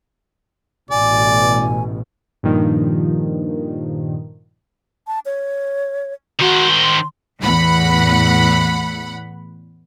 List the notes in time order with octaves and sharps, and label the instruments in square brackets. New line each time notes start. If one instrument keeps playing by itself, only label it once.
[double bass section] A1 B2 [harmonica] D5 [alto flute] G#5
[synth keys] G2 A#2 D#3 F3
[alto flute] A5
C#5
[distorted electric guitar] D#3 C5 [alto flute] F#4
[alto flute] C6
[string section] E2 A2 F#5 B5